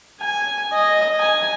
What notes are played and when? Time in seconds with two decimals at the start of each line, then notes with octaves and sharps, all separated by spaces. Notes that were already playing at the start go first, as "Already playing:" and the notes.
0.20 G#5
0.73 D#5
1.19 G#5